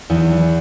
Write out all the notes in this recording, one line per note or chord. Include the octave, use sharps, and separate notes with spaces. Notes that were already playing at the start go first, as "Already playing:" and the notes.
E2